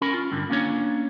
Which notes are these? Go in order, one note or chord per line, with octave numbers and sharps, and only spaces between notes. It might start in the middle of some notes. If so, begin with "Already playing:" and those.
C#4 A#4 B5
F4
G2 D3
A#3 C#4 D4 C#5